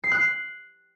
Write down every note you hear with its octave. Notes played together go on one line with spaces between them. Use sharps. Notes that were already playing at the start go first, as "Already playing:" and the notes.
C7
F#6
C7